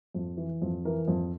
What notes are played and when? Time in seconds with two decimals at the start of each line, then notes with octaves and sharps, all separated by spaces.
0.14 F2
0.37 E3
0.62 F2
0.85 E3 A#4
1.08 F2